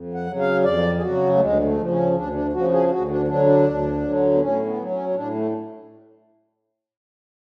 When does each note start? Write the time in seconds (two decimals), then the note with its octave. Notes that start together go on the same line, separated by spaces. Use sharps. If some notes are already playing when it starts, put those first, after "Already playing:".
Already playing: F2
0.14 F#5
0.27 C#3 F#3
0.39 F5
0.64 F2 D5
0.97 G#4
1.02 C#3 F#3 F#4
1.34 A3
1.39 D2 G#3
1.64 A3
1.77 C#3 F3
1.90 C#4
2.14 D2 D4
2.34 D4
2.53 C#3 F3 F#4
2.71 G#4
2.90 D2 F#4
3.08 D4
3.28 D3 F#3 D4
3.46 D4
3.66 D2
4.03 D3 F#3
4.34 B3
4.41 A2 C#4
4.66 B3
4.77 F#3
4.91 C#4
5.09 C#4
5.15 A2 D4
5.34 A3